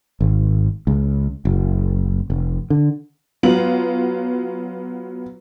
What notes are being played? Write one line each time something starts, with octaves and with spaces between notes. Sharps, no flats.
G#1
C#2
F#1
F1
D3
F#3 B3 F4 F#7